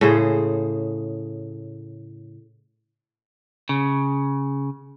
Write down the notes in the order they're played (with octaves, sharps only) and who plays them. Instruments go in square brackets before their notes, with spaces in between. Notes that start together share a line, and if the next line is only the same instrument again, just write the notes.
[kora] A2 C#3 G#4 C5
[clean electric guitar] C#3